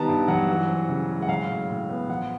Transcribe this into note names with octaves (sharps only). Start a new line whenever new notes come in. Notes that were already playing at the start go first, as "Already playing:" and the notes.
Already playing: D#3 G3 B3 A5 A#5
G2
F#3 F#5
E3
C4
C#3
G#3
F#5
F#3 F5
A2
A2
B3
F3 F#5